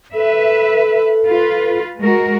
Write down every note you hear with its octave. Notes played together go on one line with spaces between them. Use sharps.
A4 B4 E5
F4 B4
G#3 F#4 A#4